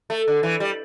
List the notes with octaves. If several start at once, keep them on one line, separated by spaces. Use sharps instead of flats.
A3
D3
E3
G3